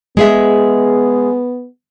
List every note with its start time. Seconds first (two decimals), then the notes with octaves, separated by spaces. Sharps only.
0.17 G#3 B3 G#4 E5